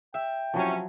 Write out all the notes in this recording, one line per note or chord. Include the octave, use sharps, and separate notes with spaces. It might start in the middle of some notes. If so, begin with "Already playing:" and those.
E5 G5
C3 F3 F#3 C#4 E4